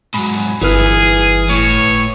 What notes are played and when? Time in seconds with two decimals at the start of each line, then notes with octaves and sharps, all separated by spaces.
0.14 G#2 F#3 B5
0.62 G1 E3 G#4 B4 F6
1.50 A2 C#5